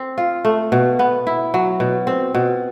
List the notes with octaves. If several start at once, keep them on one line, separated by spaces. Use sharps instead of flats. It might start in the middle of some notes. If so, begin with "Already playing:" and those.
Already playing: C4
F4
A3
B2
B3
E4
F#3
B2
C4
B2